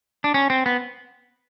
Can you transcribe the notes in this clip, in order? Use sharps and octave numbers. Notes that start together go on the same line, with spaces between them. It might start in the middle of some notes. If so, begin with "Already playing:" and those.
D4
C#4
C4
B3